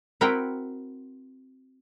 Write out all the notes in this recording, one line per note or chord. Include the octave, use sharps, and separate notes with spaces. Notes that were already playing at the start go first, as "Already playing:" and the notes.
C4 E4 F#4 A#4 B4 G5